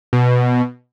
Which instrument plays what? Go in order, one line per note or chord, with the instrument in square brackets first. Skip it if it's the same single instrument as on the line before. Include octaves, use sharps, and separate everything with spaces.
[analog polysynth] B2